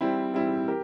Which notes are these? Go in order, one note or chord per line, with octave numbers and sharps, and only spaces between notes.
G3 C4 E4
G3 C4 E4
G4 A#4